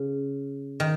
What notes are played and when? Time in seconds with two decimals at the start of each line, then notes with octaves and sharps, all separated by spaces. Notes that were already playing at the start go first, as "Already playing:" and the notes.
Already playing: C#3
0.80 D#3